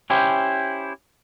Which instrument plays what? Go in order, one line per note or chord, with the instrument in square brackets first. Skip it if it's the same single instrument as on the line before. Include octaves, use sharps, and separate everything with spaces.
[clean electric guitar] C#4 E4 G4 C5